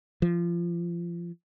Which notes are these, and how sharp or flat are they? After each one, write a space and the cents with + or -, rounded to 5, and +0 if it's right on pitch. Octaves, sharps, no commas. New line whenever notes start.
F3 -25